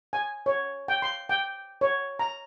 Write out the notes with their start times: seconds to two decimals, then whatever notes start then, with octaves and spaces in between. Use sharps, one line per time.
0.13 G#5
0.46 C#5
0.88 G5
1.02 C6
1.29 G5
1.81 C#5
2.19 A#5